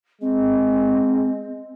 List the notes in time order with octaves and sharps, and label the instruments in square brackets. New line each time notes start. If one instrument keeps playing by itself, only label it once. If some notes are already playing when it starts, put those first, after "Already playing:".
[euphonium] G#3 [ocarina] C4